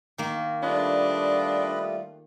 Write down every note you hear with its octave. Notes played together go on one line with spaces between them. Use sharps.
D#3 A#3
G3 A3 D4 F4 B4 D#5 B5